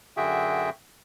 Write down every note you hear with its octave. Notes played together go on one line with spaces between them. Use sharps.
F#2 D3 F#4 G#4 E5 G5